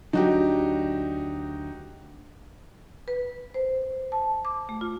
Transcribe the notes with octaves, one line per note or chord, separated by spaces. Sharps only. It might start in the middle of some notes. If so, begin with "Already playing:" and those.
D2 F#3 D4 D#4 F#4 G4
B4
C5
A5
D6
A3
F4